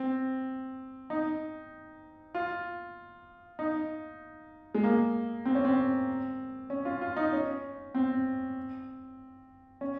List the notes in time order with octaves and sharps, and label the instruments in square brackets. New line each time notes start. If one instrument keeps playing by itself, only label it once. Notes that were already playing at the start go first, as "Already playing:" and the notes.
Already playing: [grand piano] C4
D#4
F4
D#4
G#3
A#3
C4
C#4
C4
C#4
F4
F4
D#4
C#4
C4
C#4